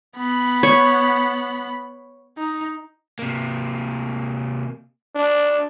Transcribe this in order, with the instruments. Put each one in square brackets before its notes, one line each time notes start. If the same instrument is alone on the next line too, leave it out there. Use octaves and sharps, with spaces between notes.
[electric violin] B3 B5
[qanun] C#5
[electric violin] D#4
[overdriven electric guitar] C3 A#3
[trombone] D4